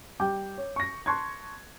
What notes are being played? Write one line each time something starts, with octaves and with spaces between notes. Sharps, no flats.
G3 G5 D6 G6
C#5
C#6 A#6
A5 C6 C#6 F#6 G#6